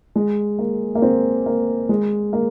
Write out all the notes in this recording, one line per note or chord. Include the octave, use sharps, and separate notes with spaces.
G#3
A#3
A#3
C4
A#3
G#3
A#3